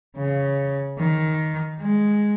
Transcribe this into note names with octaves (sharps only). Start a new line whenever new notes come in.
C#3
D#3
G#3